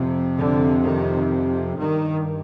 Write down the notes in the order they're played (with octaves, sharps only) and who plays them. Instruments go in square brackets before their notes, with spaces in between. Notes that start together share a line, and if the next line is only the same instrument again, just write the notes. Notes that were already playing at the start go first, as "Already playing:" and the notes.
Already playing: [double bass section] F2 C3
D3
D#3
G2 D#3